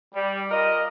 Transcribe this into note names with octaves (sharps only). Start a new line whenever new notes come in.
G3
F4 A#4 D#5